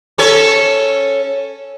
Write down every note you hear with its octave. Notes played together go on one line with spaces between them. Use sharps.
C#4 A4 C#5